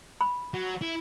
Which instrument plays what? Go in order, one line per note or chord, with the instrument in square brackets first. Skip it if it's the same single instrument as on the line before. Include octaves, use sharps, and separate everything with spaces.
[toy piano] B5
[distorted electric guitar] F#3
E4